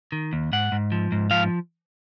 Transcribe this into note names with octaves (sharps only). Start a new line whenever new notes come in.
D#3
D#2
G#2 F#5
G#2
F3
G#2
F3 F5